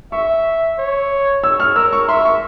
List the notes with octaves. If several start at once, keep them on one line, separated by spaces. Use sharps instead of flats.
E5 C#6
C#5
C#5 E6
F6
A#4 E6
C#6
E5 C6
C#6